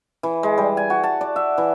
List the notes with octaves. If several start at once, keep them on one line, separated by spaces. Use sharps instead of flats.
E3
G#3
G3
G#5
F#4
A5
D5
E5
E3